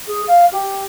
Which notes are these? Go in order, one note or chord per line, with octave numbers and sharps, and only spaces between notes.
G#4
F5
G4